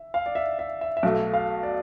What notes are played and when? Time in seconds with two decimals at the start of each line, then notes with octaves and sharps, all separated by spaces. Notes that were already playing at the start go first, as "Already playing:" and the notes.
Already playing: E5
0.14 F5
0.26 D5
0.35 E5
0.59 E5
0.81 E5
0.97 E5
1.03 B1 B2 A3 F5
1.33 F5
1.63 D5